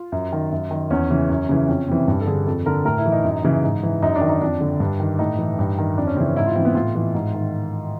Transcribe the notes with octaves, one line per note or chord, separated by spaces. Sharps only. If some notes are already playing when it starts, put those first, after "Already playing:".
Already playing: F4
F#2
D#3
F#2
D#3
E2 C#4
C#3 E3
F#2
C#3 E3
F2 C#4
C3 E3 C4
G2
A4
D3 G#4
F2 A4
D3 A#4
A2 A#4
E4
E3
D#4
F#2
C#3 E3
G#2
E3
F#2 D#4
D4
D#3
D#4
F2 D4
D3
G2
D#3
A2 D#4
E3
G2
D#3
F2 D4
C#4
C#3 E3 C4
C#4
G#2 E4
F4
E3 C4
B3
A2 F4
E3
G#2
D#3